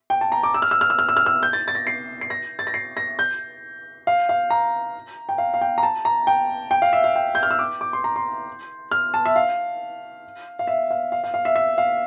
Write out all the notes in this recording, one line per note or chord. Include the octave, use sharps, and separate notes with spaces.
G5
A5
A#5
D6
E6
F6
E6
F6
E6
F6
E6
F6
E6
G6
A6
A6
A#6
C7
C7
A#6
A6
A#6
C7
A#6
G6
F5
F5
A#5
G5
F5
F5
G5
A#5
A5
A#5
G5
G5
F5
E5
F5
G5
G6
F6
E6
D6
D6
C6
A#5
C6
F6
A5
E5
F5
F5
E5
F5
F5
F5
F5
E5
E5
F5